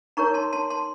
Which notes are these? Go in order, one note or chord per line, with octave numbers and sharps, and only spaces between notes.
D#4 A#4 C#5 A#5 C#6
A5 C6
A5 C6
A5 C6